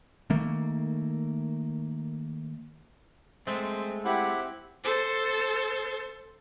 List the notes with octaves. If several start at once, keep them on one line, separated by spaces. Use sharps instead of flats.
D#3 A3 A#3
G#3 A3 C4
C4 E4 G4 F#5 B5
A4 C5